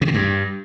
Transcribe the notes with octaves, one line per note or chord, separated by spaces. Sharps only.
C3
D3
G2